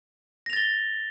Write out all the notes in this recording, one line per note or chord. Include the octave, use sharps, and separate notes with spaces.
A6 A#6 F7 G7